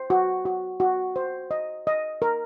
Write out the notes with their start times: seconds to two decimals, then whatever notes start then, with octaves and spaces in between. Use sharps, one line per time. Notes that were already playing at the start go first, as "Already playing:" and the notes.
Already playing: C5
0.10 F#4
0.45 F#4
0.80 F#4
1.16 C5
1.51 D#5
1.87 D#5
2.22 A#4